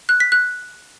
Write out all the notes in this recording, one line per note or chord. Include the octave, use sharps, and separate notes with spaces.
F#6
B6
F#6